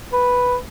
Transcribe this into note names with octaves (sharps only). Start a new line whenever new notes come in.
B4